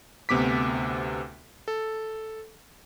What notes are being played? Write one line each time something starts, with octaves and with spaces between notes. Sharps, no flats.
D2 C3 B3 D6 B6
A4